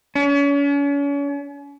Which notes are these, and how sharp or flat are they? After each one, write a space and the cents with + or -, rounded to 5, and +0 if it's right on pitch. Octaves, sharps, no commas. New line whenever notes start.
C#4 +40